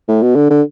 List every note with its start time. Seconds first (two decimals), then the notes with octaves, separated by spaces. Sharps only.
0.08 A2
0.22 B2
0.35 D3
0.50 D3